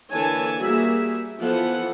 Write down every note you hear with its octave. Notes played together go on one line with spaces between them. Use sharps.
D3 E3 A#3 C#5 G#5 A5
G3 A#3 F#4 G#4 E5
E3 F3 B3 A4 F#5